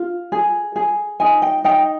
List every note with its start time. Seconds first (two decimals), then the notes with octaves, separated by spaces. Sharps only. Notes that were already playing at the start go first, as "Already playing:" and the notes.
Already playing: F4
0.32 G#4
0.76 G#4
1.20 D#4 G#5
1.42 G5
1.64 D#4 G5